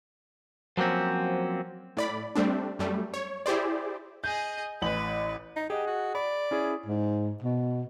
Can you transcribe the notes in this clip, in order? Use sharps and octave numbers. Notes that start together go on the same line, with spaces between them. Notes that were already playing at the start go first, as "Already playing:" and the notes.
F3 F#3 A#3 C4 C#4
A2 D5 B5
G3 A3 C4 D4
F#2 G3 A3
C#5
E4 G4 G#4 C5 D5
G#4 D#5 G6
A1 B4 F#7
D#4
G4 G#4 D#5 F#5
F#4
D5 B5
C#4 E4 G#4
G#2
B2